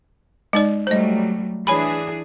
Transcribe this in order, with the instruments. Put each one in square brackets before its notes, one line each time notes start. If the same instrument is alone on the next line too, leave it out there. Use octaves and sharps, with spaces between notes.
[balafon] G#3 D#4 D5
[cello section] F#3 G3 A3 [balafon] C5 D#5
[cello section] E3 D4 G#4 [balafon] C#5 G#5 B5